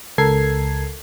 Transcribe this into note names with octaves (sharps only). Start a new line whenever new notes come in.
C#2 A4 A#4 G#6 C7